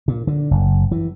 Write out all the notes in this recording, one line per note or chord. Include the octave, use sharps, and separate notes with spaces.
A#2
D3
F#1
E3